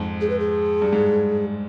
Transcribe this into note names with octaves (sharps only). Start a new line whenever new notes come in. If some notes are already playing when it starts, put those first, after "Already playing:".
Already playing: F2 G#2
G#4
B4
G#4
G2
G#2